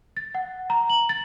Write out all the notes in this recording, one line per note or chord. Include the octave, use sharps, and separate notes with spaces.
A6
F#5
A#5
F#7
A6